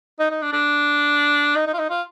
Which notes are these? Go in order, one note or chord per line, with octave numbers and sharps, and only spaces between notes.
D#4
D#4
D4
D4
D#4
D#4
F4
D#4
F4